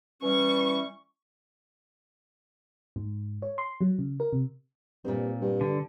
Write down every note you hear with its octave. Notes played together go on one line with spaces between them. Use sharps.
E3 G3 C#4 C#6
G#2
C#5
C6
F#3
C#3
A#4
C3
G2 A#2 A3 C4
G2
D3